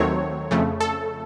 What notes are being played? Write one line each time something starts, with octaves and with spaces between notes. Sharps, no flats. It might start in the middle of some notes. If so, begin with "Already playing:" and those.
Already playing: D#2 D#3 F#3 A3 C4 C#5
F2 C#3 A3
A4